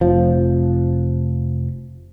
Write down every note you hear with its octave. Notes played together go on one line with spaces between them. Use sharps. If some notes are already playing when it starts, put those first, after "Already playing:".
F1 F3